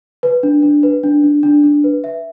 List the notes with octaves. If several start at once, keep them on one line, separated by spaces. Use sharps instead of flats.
B4
D4
D4
B4
D4
D4
D4
D4
B4
E5